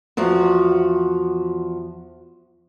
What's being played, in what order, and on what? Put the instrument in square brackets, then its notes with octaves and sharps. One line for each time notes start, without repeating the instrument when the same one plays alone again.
[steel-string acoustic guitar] E2 F3 F#4